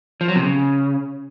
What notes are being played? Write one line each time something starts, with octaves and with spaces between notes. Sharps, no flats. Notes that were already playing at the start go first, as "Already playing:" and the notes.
F3
F#3
C3
C#3